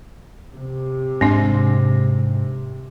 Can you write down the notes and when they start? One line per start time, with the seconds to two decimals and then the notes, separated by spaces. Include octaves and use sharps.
0.55 C3
1.21 G#2 C4 D4